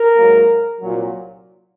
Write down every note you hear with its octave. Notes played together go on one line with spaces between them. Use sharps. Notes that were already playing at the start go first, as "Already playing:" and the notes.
Already playing: A#4
G#2 F#3 A#3
C2 A#2 F#3